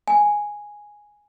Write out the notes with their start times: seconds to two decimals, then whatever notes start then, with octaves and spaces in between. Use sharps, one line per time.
0.08 G#5